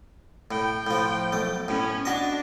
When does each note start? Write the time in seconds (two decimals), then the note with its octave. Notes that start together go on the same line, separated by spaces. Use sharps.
0.51 A2 G5
0.87 A2 F3
1.32 B1 A3
1.68 A2 B3 C#4
2.05 D4 F#4 D#5